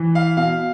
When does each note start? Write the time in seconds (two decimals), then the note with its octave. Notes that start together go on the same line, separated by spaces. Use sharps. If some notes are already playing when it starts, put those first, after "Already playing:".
Already playing: E3
0.15 F5
0.37 B2 F5